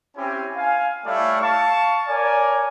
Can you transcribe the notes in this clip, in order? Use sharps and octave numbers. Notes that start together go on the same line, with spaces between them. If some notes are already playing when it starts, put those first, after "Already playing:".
C4 C#4 E4 G4 G#5
F5 G#5
G3 A3 E4 C#5 D5 F5
F5 A5 C#6
A#4 C#5 D5 G#5